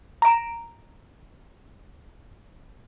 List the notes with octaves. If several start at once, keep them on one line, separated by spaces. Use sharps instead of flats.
A#5 A#6 D7 E7